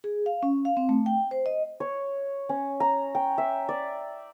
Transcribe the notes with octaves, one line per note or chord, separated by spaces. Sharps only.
G#4
F5
C#4
F5
C4
A3
G5
C5
D#5
C#5
C#4
A#5
G5
E5
D5